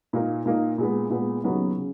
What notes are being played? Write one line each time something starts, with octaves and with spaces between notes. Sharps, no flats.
A#2 A#3 D#4
A#2 A#3 D#4
A#2 G#3 B3
A#2 G#3 B3
D#2 C#3 F#3 B3 D#4
C#3